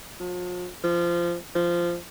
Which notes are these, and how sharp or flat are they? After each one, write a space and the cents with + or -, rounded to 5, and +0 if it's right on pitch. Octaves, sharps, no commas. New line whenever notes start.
F3 +40
F3 -20
F3 -15